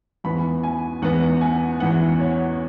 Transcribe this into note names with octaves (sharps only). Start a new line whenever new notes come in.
E2 E3 B3 B5
G#5
E2 E3 B3 F#5
G#5
E2 E3 B3 F#5
C#5